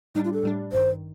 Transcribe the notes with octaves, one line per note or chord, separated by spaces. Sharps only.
A2 G3 D4 D#4
F4
A4
A2 G3 D4
A1 G2 D#3 C5